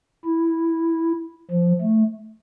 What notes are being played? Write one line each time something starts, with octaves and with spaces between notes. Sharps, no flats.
E4
F3
A3